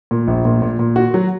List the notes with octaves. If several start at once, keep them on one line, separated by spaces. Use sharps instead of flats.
A#2
A#1
A#2
A#2
A#2
F#4
F#3